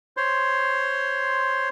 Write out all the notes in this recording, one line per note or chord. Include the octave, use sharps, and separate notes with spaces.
C5 C#5 C6